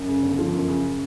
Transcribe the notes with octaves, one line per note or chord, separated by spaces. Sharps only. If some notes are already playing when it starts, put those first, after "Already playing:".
Already playing: F#2
C#3
G1
F3
F#2
C#3